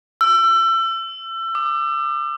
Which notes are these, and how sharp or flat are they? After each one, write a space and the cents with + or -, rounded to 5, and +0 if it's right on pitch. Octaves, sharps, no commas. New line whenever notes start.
E6 +30
D6 +40